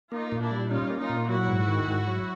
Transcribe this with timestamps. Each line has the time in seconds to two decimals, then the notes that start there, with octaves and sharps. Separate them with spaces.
0.12 A#3 D#4 F4
0.32 A#2
0.41 D4 E4
0.51 G3
0.70 C#4 D#4 F4
0.90 A#3
0.99 D#4 F4
1.10 A#2
1.29 F#3 E4 F#4
1.48 G#2
1.68 D#3
1.88 G#2
2.07 F#3